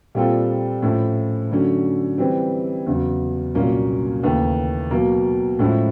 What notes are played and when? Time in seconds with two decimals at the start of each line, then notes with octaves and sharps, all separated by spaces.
0.15 A#2 G3 C4 F4 A4
0.82 A2 F3 A3 C#4 E4
1.51 D3 F#3 A3 C#4
2.18 E3 G3 C4
2.86 E2 C#3 F#3
3.55 C2 A#2 F#3 A#3 C#4
4.23 D#2 C#3 E3 A3
4.91 B2 F#3 A#3
5.59 A2 F3 G#3 C#4 E4